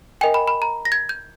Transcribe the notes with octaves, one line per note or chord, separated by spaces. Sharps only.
A#4 D#5 G5 G#5
B5
B5
A#5
A#6
G#6
G6